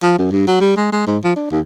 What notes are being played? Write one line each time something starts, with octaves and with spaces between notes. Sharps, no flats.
F3
F#2
G2
F#3
G3
G#3
G#3
G#2
F3
D4
D#2